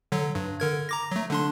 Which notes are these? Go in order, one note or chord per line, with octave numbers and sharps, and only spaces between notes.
D3 F#3
G2
D3 A#4 G#6
A#5 D6 A#6
F#3 A3
D3 D4 C6